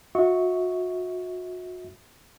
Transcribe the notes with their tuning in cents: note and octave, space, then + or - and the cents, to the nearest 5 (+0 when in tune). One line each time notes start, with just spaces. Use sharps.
F#4 -35 E5 -35 C#6 +0